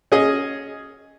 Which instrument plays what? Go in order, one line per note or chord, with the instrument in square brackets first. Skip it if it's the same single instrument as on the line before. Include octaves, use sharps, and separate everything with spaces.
[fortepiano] C#4 G#4 D#5